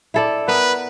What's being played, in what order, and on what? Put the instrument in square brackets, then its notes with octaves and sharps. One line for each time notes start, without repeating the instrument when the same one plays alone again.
[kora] E4 A4 D5
[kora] B3 A#4 [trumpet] B4